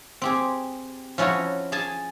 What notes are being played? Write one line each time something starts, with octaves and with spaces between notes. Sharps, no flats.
C4 G4 G#4
F3 C#4 E4 F#4 C#5
G#4 G#5 A5